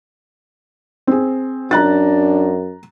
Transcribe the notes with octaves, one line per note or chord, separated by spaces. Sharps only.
C4 G#4
F#2 D4 A#5 F#6 A6